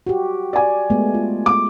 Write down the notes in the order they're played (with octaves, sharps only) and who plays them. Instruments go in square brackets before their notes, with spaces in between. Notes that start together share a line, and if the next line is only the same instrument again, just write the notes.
[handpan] F#4 G4
[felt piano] D5 G#5
[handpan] G#3 A3 B3
F4
[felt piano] D6